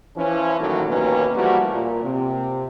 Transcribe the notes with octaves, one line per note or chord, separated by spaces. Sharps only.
E3 F3 C#4
A1 A#2 D#3 E3 F#3 A3
A1 D#2 B2 A#3 C#4 B4
E3 F3 G3 A3 A#3 F#4
A#2
C3